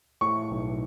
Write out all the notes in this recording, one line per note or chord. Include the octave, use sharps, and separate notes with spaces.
A2 C#6
B1